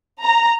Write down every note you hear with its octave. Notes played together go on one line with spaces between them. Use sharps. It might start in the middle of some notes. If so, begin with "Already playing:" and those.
A#5